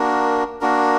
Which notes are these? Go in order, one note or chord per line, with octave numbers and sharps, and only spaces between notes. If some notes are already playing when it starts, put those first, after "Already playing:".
Already playing: A#3 D4 F#4 A#4
A#3 D4 F#4 A#4